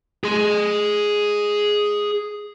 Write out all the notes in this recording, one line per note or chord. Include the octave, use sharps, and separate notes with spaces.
G#4 C6